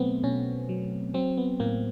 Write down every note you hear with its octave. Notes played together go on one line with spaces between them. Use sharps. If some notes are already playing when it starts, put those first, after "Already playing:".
Already playing: B2 F#3 A3 B3 C4
B2 C#4
F#3
F#3 C4
B3
A2 A#3